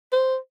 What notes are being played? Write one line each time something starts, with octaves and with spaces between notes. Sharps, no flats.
C5